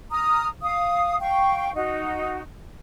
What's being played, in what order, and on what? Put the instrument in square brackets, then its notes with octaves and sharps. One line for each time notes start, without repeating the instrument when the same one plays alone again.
[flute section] A#5 D#6 F6
F5 D#6
F5 G5 C#6
D#4 F#4